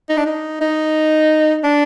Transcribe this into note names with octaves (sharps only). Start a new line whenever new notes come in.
D#4
D4
D#4
D#4
D4